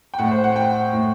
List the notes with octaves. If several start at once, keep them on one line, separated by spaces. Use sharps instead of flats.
G5
A2 F#5
C5
F#5
G5
A2